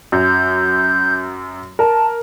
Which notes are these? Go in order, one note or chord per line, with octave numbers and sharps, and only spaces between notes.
F#2 G6
A#4 A5